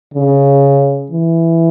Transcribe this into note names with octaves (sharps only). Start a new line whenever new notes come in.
C#3
E3